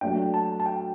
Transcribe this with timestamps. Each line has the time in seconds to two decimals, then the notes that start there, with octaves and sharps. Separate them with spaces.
0.01 F#3 A3 D4 G5
0.34 A5
0.60 A5
0.66 G5